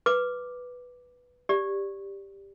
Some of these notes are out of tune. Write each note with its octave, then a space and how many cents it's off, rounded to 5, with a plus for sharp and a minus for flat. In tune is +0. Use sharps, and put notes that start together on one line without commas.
B4 +0 D6 +0
G4 +10 D5 -10